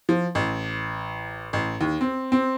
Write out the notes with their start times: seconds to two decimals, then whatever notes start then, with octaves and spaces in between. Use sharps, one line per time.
0.09 F3
0.35 A1
1.53 A1
1.81 D#2
2.01 C4
2.32 C4